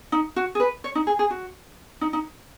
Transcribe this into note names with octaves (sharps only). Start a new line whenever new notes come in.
D#4
F#4
G#4
B4
C#5
D#4
G#4
G#4
F#4
D#4
D#4